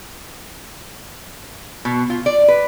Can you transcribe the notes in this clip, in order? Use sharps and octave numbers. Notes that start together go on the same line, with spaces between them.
B2
F4
D5
B4